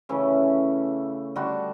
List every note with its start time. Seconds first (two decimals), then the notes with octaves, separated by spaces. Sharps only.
0.09 C#3 E3 A3 C#4
1.36 D3 G3 D4 F#4